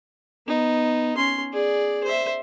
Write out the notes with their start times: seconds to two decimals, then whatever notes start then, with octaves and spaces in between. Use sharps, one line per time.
0.47 B3 D#4
1.17 C#4 C6
1.53 G#4 D5
2.04 C5 E5